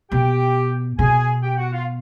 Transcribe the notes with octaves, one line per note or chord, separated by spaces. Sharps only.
B2 G4 G5
B2 G#4 G#5
G4 G5
F#4 F#5
F4 F5